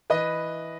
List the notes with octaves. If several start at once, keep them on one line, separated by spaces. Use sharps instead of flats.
E3 B4 D#5